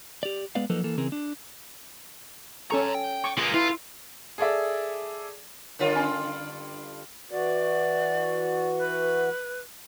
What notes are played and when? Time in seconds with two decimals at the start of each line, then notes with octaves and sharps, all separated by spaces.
0.23 G4 D5
0.55 G#3 B3 B4 D5 F5
0.70 F3 F#3 A#3 D#4 A4 B4
0.84 E3 A#3 A4
0.98 C#3 E3 C4 G#4 A#4
1.12 D4
2.71 C#4 A4 G#5 A#5 C#6
2.94 G5
3.24 C#6 D6
3.38 A#3 F4 G#4 B4
3.54 E4 F4 A4 B4
4.38 G#4 A4 D5 E5
5.79 G2 D3 F4 A#4 C#5
5.96 C#4 G#5
7.31 E3 F#4 D5
8.77 B4